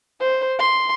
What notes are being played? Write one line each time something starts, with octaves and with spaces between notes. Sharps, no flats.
C5
C6